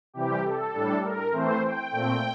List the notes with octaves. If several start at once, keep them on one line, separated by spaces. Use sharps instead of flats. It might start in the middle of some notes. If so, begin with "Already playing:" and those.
C3 E3 G3 G4
A4
A2 G3 D4
A#4
E3 A3 C4 C5
G5
A#2 A3 C4